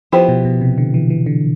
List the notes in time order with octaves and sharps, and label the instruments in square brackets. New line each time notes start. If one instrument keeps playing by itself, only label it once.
[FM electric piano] F3 [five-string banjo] B3 E4 G4 C5
[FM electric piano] B2
B2
C3
D3
E3
E3
D3